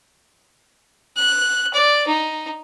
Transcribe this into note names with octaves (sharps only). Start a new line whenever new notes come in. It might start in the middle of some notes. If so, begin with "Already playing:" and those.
F#6
D5
D#4